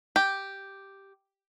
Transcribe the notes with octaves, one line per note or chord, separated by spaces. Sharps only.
G4